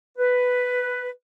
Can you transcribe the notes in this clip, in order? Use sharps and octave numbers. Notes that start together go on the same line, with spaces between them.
B4